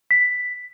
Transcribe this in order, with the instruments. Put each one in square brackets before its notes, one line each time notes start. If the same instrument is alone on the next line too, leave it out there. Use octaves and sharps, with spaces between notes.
[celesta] B6